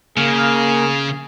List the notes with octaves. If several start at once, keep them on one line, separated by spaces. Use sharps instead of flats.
C#3 A#3 G#4